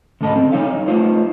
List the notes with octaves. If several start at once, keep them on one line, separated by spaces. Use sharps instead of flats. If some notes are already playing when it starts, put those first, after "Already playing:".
D2 G#2 C#3 A4 D#5 B5
C4
G3 D#4 A4 C#5 F5
A3 B3 D#4 F4 C5